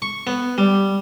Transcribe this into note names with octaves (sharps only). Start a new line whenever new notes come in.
C#6
B3
G3